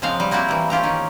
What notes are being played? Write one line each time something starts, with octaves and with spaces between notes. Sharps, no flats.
C#3 F3 G#3 C4 F5 A#5
G3
A#3 C4 E4 F#4 G4
E3 G3
C#4 F4 G4 A#5
D#3 C#4